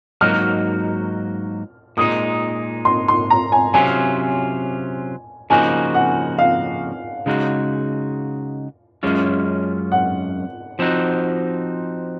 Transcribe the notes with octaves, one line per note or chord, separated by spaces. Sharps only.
G#2 F#3 A#3 D#4 F#4 F6
A#2 G#3 D#4 D#6
C6
C6
A#5
G#5
C3 F#3 C#4 F4 G#5
C#3 F3 A#3 D#4 F#4 G#5
F#5
F5
C#3 G#3 D#4 F#4
F#2 C#3 G#3 C#4 F4
F#5
F3 C4 D#4 F#4